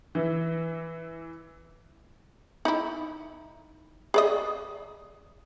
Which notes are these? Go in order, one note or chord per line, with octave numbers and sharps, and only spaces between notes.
E3 E4
D#4 E4
G#4 D5 D#5